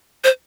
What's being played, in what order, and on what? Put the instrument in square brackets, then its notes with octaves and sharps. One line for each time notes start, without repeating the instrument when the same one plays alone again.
[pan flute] C5